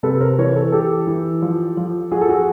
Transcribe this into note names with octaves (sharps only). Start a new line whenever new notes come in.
C3 A4 B4
A#4 C5
E3 B4 C#5
A4 B4
E3 G4 A4
E3
F3
F3
F3 F#4 G#4
A4
F#4 G#4